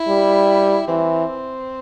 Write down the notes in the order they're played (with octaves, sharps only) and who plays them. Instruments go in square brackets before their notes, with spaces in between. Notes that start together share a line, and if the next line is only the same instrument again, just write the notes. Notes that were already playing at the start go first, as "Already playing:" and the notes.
Already playing: [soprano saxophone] E4
[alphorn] G3
[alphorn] E3 [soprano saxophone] C4